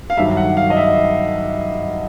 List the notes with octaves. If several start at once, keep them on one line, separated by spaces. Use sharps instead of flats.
F5
G2 D#3 F#3 E5
F#5
F5
D#5
E5